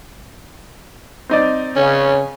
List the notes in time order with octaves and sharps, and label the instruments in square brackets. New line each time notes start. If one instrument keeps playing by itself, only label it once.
[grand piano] C4 D#4 D5
[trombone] C#3 [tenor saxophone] C#4